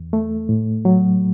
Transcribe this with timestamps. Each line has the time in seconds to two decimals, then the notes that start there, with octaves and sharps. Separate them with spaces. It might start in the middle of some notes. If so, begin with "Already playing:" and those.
Already playing: E2
0.13 A3
0.49 A2
0.85 F#3